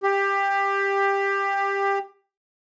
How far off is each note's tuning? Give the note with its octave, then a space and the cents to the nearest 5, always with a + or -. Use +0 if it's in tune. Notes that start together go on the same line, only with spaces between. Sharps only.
G4 +15